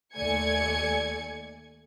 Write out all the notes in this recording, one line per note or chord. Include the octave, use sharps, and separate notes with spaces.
D#2 A3 D5 G#5 G#6 C#7